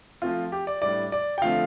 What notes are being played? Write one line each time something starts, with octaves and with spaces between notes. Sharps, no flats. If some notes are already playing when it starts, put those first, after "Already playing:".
F3 A3 C4 F4
G4
D5
A2 G3 D4 D5
D5
G5
D3 F3 A3 C4 F5